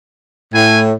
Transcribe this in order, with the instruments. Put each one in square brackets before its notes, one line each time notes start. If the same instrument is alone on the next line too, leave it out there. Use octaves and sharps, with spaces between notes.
[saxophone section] A2 [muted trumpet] G#5